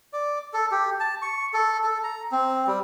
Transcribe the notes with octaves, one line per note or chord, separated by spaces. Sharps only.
D5
A4
G4
A5
C#6
A4
A4
A#5
C4
G3